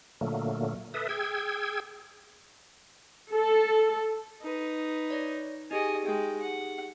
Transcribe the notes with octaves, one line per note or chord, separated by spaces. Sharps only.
A#2 D3 F#3 A3 A#3
A4 B4 E5 D#6
G#4 G5 E6 G#6
A4
D#4 B4
C#5 D5 A#6
D#4 G4 G#4 D#5 G#5
G#3 G5
F#5